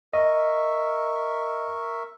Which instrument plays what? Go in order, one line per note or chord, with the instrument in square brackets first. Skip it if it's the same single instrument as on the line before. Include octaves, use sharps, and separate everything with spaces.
[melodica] A#4 E5 C#6 [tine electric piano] D#5